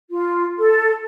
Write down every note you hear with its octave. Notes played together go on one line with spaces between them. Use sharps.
F4
A4